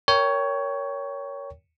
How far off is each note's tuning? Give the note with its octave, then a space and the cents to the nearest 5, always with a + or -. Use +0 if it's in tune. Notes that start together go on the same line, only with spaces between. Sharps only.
A#4 +0 C#5 +15 G5 +0